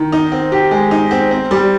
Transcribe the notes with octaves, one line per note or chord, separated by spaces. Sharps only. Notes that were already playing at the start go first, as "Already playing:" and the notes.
Already playing: D#3
D#4
C4
G4
G#3
D#4
C4
C4
G3